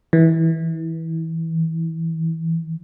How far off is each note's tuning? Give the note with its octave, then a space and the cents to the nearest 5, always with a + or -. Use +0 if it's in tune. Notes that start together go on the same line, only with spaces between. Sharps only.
E3 -20